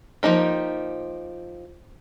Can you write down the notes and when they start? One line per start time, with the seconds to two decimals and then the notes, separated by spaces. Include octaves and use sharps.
0.23 F3 F#3 A#3 D#4 G4